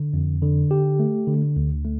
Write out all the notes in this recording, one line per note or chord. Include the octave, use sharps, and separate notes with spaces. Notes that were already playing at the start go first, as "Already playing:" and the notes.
Already playing: D3
F2
D3
G4
A3
D3
D2
A3